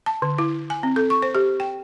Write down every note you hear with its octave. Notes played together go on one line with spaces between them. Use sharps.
A5
D3
E4
G#5
C4
A4
C#6
C5
G4
G5